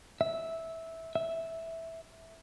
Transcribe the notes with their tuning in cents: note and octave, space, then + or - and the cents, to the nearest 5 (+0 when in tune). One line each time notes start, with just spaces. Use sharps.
E5 -10
E5 -5